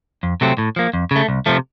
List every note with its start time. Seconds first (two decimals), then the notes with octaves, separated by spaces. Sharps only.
0.23 F2
0.41 C3 F#3 A3 C4
0.58 A2
0.76 F3 A#3
0.94 F2
1.11 C#3 A3
1.29 C2
1.46 C3 F3 A3